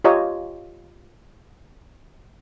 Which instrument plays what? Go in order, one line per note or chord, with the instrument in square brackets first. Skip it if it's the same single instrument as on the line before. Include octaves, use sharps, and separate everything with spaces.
[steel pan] F4 G4 C#5 D#5 A#5